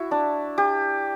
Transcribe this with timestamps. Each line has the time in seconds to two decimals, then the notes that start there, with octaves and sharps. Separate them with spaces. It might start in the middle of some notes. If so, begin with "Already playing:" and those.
Already playing: E4 F#4
0.11 D4
0.58 G4